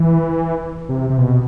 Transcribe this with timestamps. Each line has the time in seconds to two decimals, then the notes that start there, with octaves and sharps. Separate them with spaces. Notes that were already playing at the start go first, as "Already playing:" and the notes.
Already playing: E3
0.89 C3
1.10 C3
1.18 B2